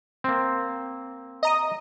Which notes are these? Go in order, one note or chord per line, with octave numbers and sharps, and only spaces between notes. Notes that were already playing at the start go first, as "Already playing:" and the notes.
A#3 C4
D#5 A#5 D#6